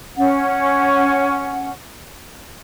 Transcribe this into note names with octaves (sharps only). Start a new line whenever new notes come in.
C#4 F#5